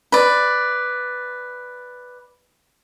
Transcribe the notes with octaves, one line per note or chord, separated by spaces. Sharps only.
B4 D5